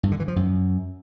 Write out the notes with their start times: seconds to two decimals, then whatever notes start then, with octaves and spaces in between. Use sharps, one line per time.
0.03 G2
0.11 D3
0.20 E3
0.28 F3
0.36 F#2